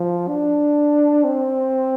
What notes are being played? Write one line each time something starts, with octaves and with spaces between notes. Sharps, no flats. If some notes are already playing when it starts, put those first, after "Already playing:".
Already playing: F3
D4
C4